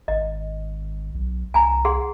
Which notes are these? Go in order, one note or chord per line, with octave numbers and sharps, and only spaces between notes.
G#1 D#5
B1
C2 G#5 A#5
G#4 F#5 C6